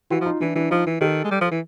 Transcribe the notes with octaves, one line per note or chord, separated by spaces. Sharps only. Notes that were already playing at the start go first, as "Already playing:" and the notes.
E3 E4 F#4
F3
D#4 F4
E3 D4 E4
E3 D4 E4
F3 D#4 F4
E3
D#3 G4 A4
G#3
G3
F3
E3